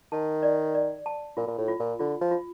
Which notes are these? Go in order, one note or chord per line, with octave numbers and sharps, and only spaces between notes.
D#3 A5
D5
D5
A5
A#2 F4
A#2
A2
F4
A#2
D3 F4
F3
F4